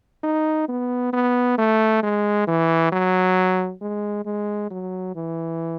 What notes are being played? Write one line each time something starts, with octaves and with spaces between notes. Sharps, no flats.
D#4
B3
B3
A3
G#3
E3
F#3
G#3
G#3
F#3
E3